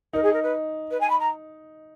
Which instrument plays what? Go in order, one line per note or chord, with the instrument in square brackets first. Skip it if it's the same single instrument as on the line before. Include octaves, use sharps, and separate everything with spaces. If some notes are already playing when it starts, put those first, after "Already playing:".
[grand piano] D#4 [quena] A#4
[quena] G#4
A#4
B4
B4
G#5
B5
A#5